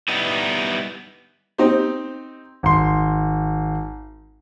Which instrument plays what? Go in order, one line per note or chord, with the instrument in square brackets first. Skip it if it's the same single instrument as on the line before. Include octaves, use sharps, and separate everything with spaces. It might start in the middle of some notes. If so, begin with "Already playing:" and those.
[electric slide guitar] G3 B3 D#4 E4
[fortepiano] C4 D#4 G4 C5
[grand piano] G#1 C6